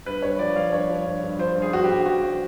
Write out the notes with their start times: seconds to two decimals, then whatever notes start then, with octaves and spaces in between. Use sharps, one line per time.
0.06 G2 B4
0.22 G2 C#5
0.39 F3 D5
0.56 F3 F5
0.73 G2 C#5
0.90 F3
1.06 G2
1.23 G2
1.39 F3 C5
1.56 G2
1.62 G#4
1.72 G2 F#4
1.84 G4
1.90 G2
2.06 F3 F#4